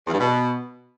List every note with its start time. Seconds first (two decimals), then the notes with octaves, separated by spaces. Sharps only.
0.07 E2
0.13 G2
0.19 B2